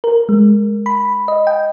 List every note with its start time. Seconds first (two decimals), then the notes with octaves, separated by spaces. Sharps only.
0.04 A#4
0.29 G#3
0.86 B5
1.28 D#5
1.47 G5